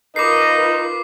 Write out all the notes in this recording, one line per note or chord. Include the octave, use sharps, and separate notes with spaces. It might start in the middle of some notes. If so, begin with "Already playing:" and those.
D#4 F4 A#4 B4 D#5 D6 C7